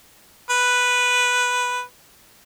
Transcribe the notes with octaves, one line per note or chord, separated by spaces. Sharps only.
B4